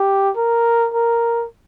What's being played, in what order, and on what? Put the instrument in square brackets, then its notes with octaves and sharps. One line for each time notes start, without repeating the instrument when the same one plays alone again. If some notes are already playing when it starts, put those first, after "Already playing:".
Already playing: [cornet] G4
A#4
A#4